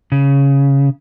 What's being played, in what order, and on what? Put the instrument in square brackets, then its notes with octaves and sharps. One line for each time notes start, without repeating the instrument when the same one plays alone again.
[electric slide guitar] C#3